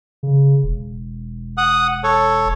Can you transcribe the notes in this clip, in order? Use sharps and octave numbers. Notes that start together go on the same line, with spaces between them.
C#3
E1
F#5 D#6
A4 C#5